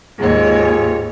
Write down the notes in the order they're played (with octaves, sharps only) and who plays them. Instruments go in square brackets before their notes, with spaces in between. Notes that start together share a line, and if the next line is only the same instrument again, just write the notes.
[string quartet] D#2 G#2 C#5 [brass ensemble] F4 G4 G#4